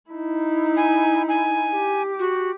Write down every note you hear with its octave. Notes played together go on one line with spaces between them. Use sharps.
D#4 E4
G#5
G#5
G4
F#4